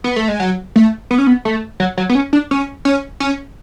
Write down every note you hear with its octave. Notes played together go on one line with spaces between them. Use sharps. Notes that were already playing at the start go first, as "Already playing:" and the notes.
B3
A3
G#3
F#3
A3
B3
C#4
B3
A3
F#3
F#3
B3
C#4
D4
C#4
C#4
C#4